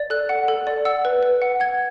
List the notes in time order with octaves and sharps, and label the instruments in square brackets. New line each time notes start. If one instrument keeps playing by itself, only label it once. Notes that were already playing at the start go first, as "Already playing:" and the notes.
Already playing: [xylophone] D5
A4 F#6
F#5
A4
D5
F#5 E6
B4
B4
F#5
F#5 G#6